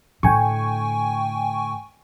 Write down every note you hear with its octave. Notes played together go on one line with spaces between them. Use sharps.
A2 D3 G5 G#5 C#6